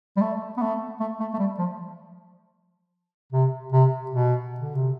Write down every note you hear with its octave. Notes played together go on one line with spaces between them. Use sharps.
G3
A3
B3
A3
A3
A3
A3
G3
F3
C3
C3
B2
D3
C3